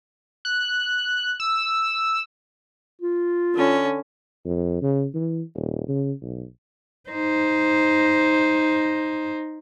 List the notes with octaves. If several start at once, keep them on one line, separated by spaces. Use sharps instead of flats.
F#6
E6
F4
D3 C#4
F2
C#3
E3
D#1
C#3
B1
D#4 C5